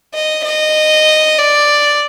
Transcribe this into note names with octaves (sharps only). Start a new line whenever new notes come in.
D#5
D#5
D5